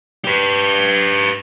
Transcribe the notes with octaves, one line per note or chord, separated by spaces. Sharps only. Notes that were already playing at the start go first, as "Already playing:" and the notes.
G4 B4